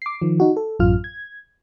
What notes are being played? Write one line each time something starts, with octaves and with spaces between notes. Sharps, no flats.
D6 C7
D#3 F3
D#4 F#4
A4
A1 F#2 F4 F6
G#6